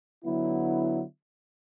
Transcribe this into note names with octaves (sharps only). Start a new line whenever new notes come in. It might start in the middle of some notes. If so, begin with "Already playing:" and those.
D3 F#3 B3 E4